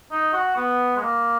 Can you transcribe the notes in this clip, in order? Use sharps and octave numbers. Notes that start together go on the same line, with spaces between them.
D#4
F#4
B3
G#3
A#3